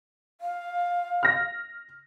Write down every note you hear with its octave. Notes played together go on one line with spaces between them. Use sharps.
F5
F6 A#6